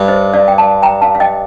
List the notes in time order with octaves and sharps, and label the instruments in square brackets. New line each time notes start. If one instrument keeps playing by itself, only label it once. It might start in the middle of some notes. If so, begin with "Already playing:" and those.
Already playing: [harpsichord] G2
[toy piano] C5 D#5
D5 F5
G5
F5 A5
G5 A#5
F5 A5
F5
D#5 G5